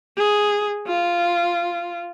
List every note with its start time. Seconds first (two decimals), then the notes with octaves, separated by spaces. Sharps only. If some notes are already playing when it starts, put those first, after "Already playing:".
0.18 G#4
0.88 F4